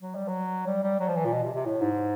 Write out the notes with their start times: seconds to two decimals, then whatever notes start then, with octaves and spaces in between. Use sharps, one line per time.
0.01 F#3
0.15 G3
0.28 F#3
0.67 G3
0.83 G3
1.00 F#3
1.08 F3
1.16 E3
1.25 A#2
1.32 B2
1.44 C3
1.54 C3
1.65 A2
1.81 G#2